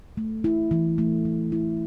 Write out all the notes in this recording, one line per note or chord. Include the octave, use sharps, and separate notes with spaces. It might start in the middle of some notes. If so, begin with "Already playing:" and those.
A3
E4
E3
A3
E3
E4